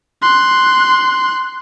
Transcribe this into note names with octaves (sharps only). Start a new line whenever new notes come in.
C6 F#6